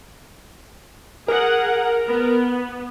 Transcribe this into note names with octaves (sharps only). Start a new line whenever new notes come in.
G#4 A#4 F#5
B3